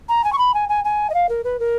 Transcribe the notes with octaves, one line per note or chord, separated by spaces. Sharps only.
A#5
G#5
C#6
B5
G#5
G#5
G#5
D#5
F5
A#4
B4
A#4